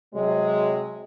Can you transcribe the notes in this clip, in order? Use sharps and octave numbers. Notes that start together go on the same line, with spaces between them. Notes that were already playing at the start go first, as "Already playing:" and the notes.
C3 F#3 G#3